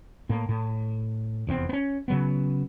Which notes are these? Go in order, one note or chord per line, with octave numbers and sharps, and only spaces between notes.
A2 A#3
A2
F1 E2 C4
B3 C#4
C#3 F#3 B3